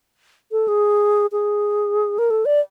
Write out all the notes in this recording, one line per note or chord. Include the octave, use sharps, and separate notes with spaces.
A4
G#4
G#4
A#4
A4
D5